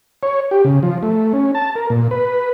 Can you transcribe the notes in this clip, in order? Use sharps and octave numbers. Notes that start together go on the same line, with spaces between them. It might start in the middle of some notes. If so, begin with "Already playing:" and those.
C#5
G4
C#3
F3
A3
C#4
A5
A#4
A#2
B4